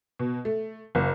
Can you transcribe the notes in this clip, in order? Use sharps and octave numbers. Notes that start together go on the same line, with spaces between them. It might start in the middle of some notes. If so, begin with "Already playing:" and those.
B2
A3
F#1